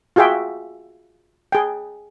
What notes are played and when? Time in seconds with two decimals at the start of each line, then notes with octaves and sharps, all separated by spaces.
0.16 F4 F#4 G#4 E5 G5
1.52 G#4 G5